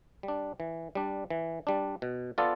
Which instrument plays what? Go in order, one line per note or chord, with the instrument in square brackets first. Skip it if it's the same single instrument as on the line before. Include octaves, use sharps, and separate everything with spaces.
[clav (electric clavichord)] G3
D4
E3
G3 D4
E3
G3 D4
B2
B3 F4 A4 D5